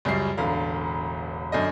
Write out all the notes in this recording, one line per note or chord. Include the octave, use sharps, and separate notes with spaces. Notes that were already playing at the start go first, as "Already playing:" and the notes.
C#2 F#2 G3 C7
E1 A1 D3 F5
F#2 D3 D#5